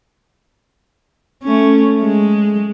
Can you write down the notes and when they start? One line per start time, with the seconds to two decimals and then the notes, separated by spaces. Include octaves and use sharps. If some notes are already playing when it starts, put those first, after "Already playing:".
1.43 A3 C#4
2.01 G#3